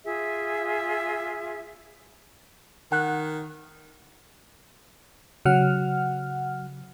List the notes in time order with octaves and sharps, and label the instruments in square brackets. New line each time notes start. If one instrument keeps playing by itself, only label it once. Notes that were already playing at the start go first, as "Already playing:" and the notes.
[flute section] F4 G#4 E5
[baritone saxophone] D#3 [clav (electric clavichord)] F#5
[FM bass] C#3 [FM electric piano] F#3 F#5 F6